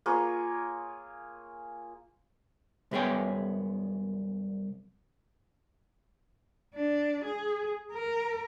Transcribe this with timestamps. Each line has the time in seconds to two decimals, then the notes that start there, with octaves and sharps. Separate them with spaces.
0.06 A#3 F4 G#4 C#5
2.91 C2 F#2 B3 G#4 C#5 G5
6.75 D4
7.25 G#4
7.92 A#4